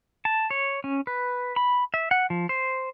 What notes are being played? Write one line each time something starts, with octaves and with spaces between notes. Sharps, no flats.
A5
C#5
C#4
B4
B5
E5
F#5
F3
C5